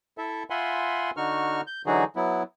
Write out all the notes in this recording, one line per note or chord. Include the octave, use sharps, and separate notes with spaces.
E4 A4 E5
F4 E5 F#5 G#5 B5 C6
D3 D#4 F#4 C#6 F6
G6
D3 E3 F#3 D#4 F#4 G#4
F#3 B3 E4